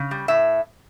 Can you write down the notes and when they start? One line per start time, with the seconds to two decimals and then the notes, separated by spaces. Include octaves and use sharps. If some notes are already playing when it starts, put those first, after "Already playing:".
Already playing: C#3
0.11 G3
0.28 A2 E5